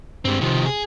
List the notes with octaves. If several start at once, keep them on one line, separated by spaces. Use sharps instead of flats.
G2 G#3 C4
C3 D#3 F3
G#4